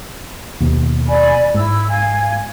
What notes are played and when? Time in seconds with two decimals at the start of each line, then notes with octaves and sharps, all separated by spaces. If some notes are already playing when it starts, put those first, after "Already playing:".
0.60 D#2 B2
1.08 D5 G#5 B5
1.54 G#2 E4 E6
1.88 F5 G#5 G#6